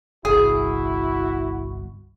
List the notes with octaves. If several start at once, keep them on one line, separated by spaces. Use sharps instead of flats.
G1 C2 E4 F#4 G#4